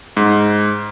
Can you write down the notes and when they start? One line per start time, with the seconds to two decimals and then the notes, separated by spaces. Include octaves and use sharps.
0.17 G#2